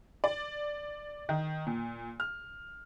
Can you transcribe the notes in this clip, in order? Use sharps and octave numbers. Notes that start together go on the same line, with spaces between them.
D5
D#3
A#2
F6